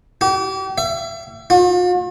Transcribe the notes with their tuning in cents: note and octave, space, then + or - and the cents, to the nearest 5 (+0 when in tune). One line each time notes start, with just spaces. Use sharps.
G4 -40
E5 +35
F4 +45